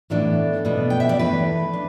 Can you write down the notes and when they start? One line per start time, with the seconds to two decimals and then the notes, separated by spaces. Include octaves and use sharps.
0.10 A2 E3 B3 D4 A4
0.65 B2 B3 D4
0.90 G5
1.00 E5
1.09 D5
1.19 E2 E3 A3 B4
1.73 D4